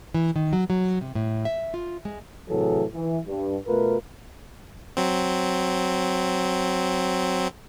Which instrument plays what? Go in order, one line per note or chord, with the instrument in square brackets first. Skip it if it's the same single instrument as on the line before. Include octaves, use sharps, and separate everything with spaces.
[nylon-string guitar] E3
D#3
F#3
F#3
C3
A2
E5
F4
G#3
[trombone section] A2 C3 E3 F#3 G#4 A4
E3
G2
B2 A3 F4 A#4 B4
[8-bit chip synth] F#3 C4